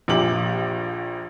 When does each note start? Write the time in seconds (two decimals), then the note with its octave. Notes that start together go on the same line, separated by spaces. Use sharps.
0.08 A#1 A#2 G4 D6 F#7